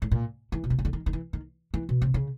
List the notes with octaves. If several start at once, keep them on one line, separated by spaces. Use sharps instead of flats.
A2
A#2
E3
B2
C3
C#3
D3
D#3
D#3
E3
D#3
E3
B2
C3
C#3